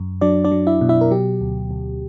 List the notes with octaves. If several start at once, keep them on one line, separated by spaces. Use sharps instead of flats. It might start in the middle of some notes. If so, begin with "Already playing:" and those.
Already playing: F#2
F#3 D4 D5
D4 D5
F#3
E4 E5
B2
E4 E5
A#4
F#3 G4
D2
D2